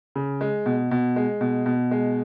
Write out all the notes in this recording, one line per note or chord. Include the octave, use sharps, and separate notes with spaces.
C#3
G#3
B2
B2
G#3
B2
B2
G#3